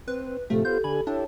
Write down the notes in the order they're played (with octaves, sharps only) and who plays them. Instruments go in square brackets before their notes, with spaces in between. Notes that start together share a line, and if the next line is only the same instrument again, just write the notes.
[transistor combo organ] C4 [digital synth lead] B4
[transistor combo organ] A2 C3 F3 [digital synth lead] A3 [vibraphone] G4 A4
[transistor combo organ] B3 F4 C5 [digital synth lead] G6
[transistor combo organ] D3 G#5 [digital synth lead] B5
[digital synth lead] D4 [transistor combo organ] E4 G4 A4 [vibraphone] C#5